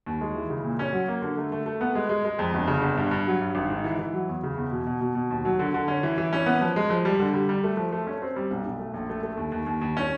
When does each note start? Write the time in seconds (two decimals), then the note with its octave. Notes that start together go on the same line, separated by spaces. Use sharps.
0.06 D#2
0.21 G#3
0.35 E3
0.50 C#3
0.64 A#2
0.79 C#4
0.93 F#3
1.08 A#3
1.22 D3
1.37 A3
1.52 A3
1.66 A3
1.81 B3
1.95 G#3
2.09 G#3
2.25 G#3
2.39 F2
2.54 G1
2.67 C#3
2.82 G1
2.97 G2
3.11 G2
3.26 F#3
3.41 G2
3.55 G#1
3.70 G#2
3.84 E3
3.99 E3
4.14 F#3
4.29 E2
4.43 C#3
4.57 E2
4.71 B2
4.87 B2
5.01 B2
5.15 B2
5.31 D#2
5.45 F#3
5.59 D3
5.74 D3
5.88 C#4
6.03 E3
6.18 E3
6.33 C#4
6.46 B3
6.61 F3
6.76 G#3
6.90 F3
7.05 G3
7.20 D3
7.34 G3
7.49 G3
7.64 A3
7.77 F3
7.92 A3
8.07 C#4
8.22 C4
8.36 G3
8.51 B1
8.65 B1
8.79 A3
8.94 A#1
9.09 A3
9.23 A3
9.37 D#2
9.52 D#2
9.67 D#2
9.82 D#2
9.97 C#4